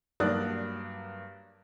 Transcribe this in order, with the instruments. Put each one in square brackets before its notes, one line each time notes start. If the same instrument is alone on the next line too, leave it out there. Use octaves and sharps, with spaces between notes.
[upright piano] G2 F#3 A#3 D5 D#6 F#6